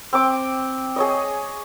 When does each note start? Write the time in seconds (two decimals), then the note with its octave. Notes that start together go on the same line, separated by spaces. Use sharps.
0.13 C4 D6
0.96 G#4 C#5 D#5